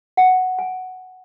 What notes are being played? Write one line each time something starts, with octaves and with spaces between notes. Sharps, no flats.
F#5
G#5